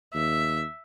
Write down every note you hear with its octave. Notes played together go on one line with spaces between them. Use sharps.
D#2 E5